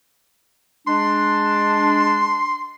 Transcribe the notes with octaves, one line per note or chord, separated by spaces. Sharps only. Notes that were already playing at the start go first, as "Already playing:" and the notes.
G#3 D4 C6